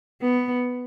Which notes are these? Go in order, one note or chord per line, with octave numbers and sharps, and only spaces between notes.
B3